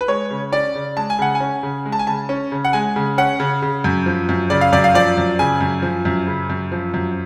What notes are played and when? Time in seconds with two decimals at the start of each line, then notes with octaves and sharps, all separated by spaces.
0.01 B4
0.08 G#3 C#5
0.31 C#3
0.52 C#4 D5
0.75 C#3
0.97 G#3 A5
1.10 G#5
1.19 C#3 F#5
1.35 G#5
1.40 C#4
1.63 C#3
1.85 G#3
1.92 A5
1.99 G#5
2.07 C#3 A5
2.29 C#4
2.52 C#3
2.65 F#5
2.73 G#3 G#5
2.96 C#3
3.18 C#4 F#5
3.40 C#3
3.62 C#3
3.84 F#2
4.06 F3
4.29 F#2
4.50 C#3 D5
4.61 F5
4.72 F#2 D5
4.84 F5
4.94 F3 D5
5.17 F#2
5.39 C#3 G#5
5.61 F#2
5.82 F3
6.05 F#2
6.27 C#3
6.50 F#2
6.72 F3
6.94 F#2